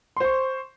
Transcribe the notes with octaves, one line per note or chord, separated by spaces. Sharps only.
C5 C6 C#6